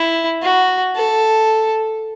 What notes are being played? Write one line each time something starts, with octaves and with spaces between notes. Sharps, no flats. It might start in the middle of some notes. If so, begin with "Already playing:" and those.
Already playing: E4
F#4
A4